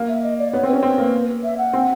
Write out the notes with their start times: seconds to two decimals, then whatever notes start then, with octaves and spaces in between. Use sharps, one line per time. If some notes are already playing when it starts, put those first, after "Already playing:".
Already playing: A#3
0.08 E5
0.23 D#5
0.39 D5
0.53 B3 C#5
0.63 C4
0.68 C#4 B4
0.83 C4 B4
0.98 A#3
1.44 E5
1.58 F#5
1.73 C4